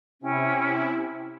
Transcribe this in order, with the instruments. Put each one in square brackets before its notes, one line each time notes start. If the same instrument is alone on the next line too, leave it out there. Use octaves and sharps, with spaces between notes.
[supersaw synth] C3 E4 [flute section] C#4 G5